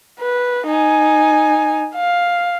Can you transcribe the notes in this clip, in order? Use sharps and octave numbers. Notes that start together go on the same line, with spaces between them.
B4
D#4 G#5
F5